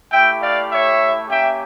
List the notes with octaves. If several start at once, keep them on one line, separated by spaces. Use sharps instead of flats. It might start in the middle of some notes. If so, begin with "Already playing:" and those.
A3 E4 G4 E5 G5
D5 F5
C#5 E5
A#3 C#4 G4 E5 G5